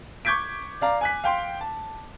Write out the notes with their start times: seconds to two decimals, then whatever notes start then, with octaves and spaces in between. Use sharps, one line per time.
0.25 C#6 D6 G6 G#6 B6 D7
0.81 D5 F5 A#5
1.01 G#5 F#6 B6
1.24 F5 G5 C6
1.61 A5